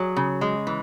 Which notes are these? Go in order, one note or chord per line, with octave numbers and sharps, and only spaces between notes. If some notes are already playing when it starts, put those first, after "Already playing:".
Already playing: F#3 G#4
C#3
G#3
E3